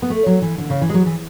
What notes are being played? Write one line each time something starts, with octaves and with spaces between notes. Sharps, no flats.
B3
A3
F#3
E3
D3
C#3
E3
G#3
F#3
E3